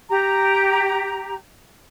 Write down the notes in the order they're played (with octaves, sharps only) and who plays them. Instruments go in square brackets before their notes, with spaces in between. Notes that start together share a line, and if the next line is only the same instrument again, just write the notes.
[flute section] G4 A#5